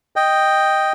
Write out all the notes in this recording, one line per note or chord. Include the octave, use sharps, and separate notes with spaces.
D#5 G5